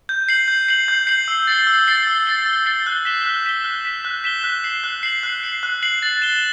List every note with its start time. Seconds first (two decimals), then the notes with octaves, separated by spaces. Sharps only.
0.09 G6
0.29 C7 F#7
0.48 G6
0.68 C7 F#7
0.88 G6
1.07 C7 F#7
1.28 E6
1.47 A6 C7 G7
1.67 E6
1.87 A6 C7 G7
2.07 E6
2.27 A6 C7 G7
2.46 E6
2.65 A6 C7 G7
2.86 F#6
3.05 B6 E7 G7
3.26 F#6
3.46 B6 E7 G7
3.64 F#6
3.85 B6 E7 G7
4.05 F#6
4.24 B6 E7 G7
4.43 F#6
4.64 C7 F#7
4.84 F#6
5.03 C7 F#7
5.23 F#6
5.43 C7 F#7
5.63 F#6
5.83 C7 F#7
6.02 A6
6.22 E7 G7